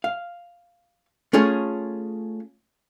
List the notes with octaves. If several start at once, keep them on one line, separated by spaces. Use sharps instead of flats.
F5
A3 C#4 F4 G#4